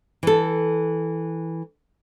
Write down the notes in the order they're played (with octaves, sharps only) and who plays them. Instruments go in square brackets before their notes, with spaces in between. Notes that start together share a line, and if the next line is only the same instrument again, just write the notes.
[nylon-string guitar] E3 A4